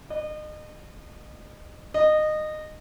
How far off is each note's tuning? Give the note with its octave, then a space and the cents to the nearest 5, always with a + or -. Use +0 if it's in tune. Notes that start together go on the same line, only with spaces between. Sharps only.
D#5 -35
D#5 -20